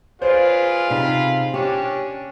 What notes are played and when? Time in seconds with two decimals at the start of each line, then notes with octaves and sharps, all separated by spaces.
0.22 F4 G#4 B4 C5 D5
0.90 C3 D#4 G#4 B5
1.54 C#4 D4 G4